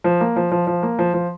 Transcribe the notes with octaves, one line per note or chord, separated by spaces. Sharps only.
F3
A#3
F3
F3
F3
A#3
F3
F3